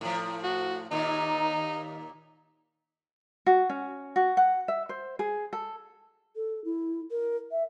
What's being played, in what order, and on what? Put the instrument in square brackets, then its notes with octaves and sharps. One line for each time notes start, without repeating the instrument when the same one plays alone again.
[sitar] A2 F3
[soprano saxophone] F#4
[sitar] D#2 A#2 [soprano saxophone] D#4
[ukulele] F#4
C#4
F#4
F#5
E5
C5
G#4
A4
[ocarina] A4
E4
A#4
E5